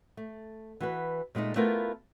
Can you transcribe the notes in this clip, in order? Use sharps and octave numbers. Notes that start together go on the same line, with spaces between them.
A3
E3 F#4 B4
A#2 G#3 A3 D#4
A3 B3 E4 F4 A#4 C5